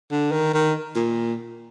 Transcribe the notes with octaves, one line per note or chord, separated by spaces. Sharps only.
D3
D#3
D#3
A#2